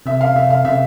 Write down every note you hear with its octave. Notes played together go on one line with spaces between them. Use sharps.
C3 E5
F5
C3 E5
F5
C3 E5